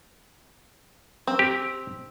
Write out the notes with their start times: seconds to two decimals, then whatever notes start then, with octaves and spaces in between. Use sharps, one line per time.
1.27 C4
1.39 G4